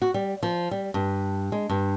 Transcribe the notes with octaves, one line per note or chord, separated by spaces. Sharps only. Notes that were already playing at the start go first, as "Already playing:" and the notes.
F#4
G3
F3
G3
G2
G#3
G2